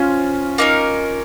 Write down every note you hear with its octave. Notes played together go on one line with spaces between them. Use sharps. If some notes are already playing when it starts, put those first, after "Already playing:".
Already playing: C#4 F4 C5
A#3 D#4 A#4